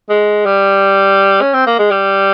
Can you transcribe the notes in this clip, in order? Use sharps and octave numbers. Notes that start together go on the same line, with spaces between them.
G#3
G3
C#4
C4
A#3
G#3
G3